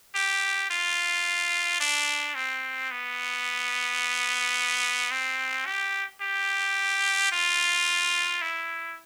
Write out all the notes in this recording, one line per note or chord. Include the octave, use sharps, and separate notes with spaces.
G4
F4
D4
C4
B3
C4
G4
G4
F4
E4